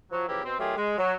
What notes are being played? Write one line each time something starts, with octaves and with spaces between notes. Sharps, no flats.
F3 F#3
C#3 E3 F3 A#3 E4 G4
B2 C4
D#3 F#3 A3 F4 G4 G#4
G#3
F#3